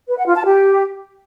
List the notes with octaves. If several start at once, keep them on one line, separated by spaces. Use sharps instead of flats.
B4
F#5
F4
A5
G4